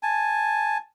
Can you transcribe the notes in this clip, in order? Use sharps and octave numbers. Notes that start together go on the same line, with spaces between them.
G#5 A5